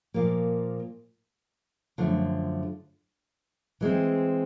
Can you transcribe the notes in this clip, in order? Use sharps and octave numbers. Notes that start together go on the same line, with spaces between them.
A#2 F3 A#3
F#2 D3 F3 A3
E3 G#3 C4